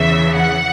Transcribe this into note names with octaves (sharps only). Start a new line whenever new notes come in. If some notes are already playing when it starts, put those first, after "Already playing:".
Already playing: E2 C#3 E3 E5
F#5